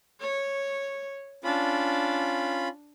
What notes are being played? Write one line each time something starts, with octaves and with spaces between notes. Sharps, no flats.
C#5
C#4 D4 F4 B5